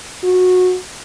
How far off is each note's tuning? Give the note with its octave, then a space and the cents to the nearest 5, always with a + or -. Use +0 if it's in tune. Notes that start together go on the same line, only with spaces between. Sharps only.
F#4 -20